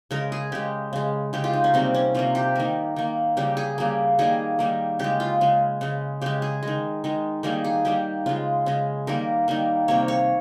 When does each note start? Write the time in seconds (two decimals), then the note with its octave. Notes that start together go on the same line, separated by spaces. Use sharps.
0.11 C#3 G#3 A#4
0.32 G#4
0.52 C#3 G#3 G4
0.93 C#3 G#3
1.33 C#3 G#3 G4
1.44 F4
1.53 D#4
1.64 C#4
1.74 C3 G3 A#3 C4
1.94 C#4
2.14 C3 G3 A#3 F4
2.35 G4
2.56 D#3 A#3
2.96 D#3 A#3
3.37 C#3 G3 A#3 G4
3.57 G#4
3.78 C#3 G3 A#3
4.19 D#3 G3 A#3 G#4
4.59 D#3 G3 A#3
4.99 C#3 G#3 G4
5.20 F4
5.41 C#3 G#3
5.81 C#3 G#3
6.21 C#3 G#3 G4
6.42 G#4
6.63 D#3 G#3
7.04 D#3 G#3
7.43 D#3 G3 A#3 G#4
7.64 G#4
7.85 D#3 G3 A#3 G4
8.26 C#3 G#3 F4
8.66 C#3 G#3
9.07 D#3 G3 A#3 A#4
9.48 D#3 G3 A#3
9.88 C3 G3 A#3 C#5
10.08 C#5